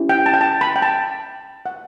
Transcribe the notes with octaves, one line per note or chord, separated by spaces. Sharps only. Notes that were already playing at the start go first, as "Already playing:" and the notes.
Already playing: C#4 E4 G4
G5
A5
G5
A5
B5
G5
A5
F#5